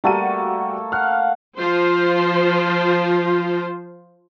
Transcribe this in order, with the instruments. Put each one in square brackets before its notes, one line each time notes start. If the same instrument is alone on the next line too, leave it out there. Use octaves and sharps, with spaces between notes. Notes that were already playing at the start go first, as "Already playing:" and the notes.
[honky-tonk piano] G3 F#4 D#7 [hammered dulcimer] A3 A#3 A4
[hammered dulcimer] F5 F#5 [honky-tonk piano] F6
[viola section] F3 F4 C5